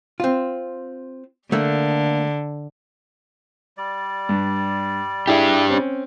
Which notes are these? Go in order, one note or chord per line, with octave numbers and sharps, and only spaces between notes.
C4 F4
D3 A3 A#3 D4
G3 D5
G2
D4 E4 G4 G#4 E5
C4 C#4